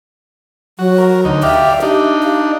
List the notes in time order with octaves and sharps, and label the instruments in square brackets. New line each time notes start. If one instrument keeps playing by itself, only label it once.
[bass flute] F#3 [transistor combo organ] F#4
[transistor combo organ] A#4
D2 D#4
[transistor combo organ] G4 D5 F5 [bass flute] E5
[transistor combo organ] D4 D#4 [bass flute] G4
[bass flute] F5